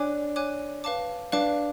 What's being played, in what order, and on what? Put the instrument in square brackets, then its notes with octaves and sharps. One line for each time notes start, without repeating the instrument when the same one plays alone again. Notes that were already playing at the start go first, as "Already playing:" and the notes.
Already playing: [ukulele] D4 [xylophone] C#5 G#5 D6 F#6
[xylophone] C#5 G#5 D6 F#6
B4 F5 A5 D6
[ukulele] D4 [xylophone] B4 F5 A5 D6